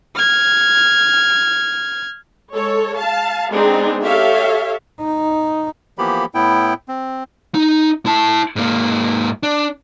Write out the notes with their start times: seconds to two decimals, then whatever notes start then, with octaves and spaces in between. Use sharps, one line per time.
0.15 F6 G#6
2.53 G#3 A4 C#5
2.98 F5 A5
3.50 G#3 B3 C4 D4 D#4 G#4
4.03 G4 A4 C#5 E5 F5
5.00 D#4
5.98 E3 F3 A#3 B3 G4 B5
6.35 A2 B3 E4 G5
6.88 C4
7.54 D#4
8.06 E4 A5
8.56 G#2 A#3
9.43 D4